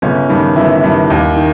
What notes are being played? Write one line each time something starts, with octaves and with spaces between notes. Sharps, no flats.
G1 C#3 C#4
G2 D#3
G1 E3 E4
G2 D#3
D#2
D#3